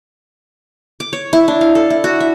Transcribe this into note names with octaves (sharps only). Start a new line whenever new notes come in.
D6
C#5
E4
D4
F5
A4
E4
F#4
E5